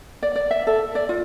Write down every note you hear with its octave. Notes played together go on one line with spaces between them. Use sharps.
D5
D5
E5
A4
D5
F4